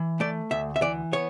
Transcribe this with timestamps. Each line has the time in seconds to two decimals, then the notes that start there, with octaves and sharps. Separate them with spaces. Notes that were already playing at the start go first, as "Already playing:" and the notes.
Already playing: E3
0.20 A3 D5
0.51 D2 E5
0.76 E5
0.81 E3 D5
1.12 B3 C#5